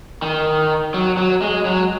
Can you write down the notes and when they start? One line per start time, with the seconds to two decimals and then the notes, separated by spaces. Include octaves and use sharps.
0.22 D#3
0.94 F#3
1.17 F#3
1.42 G#3
1.65 F#3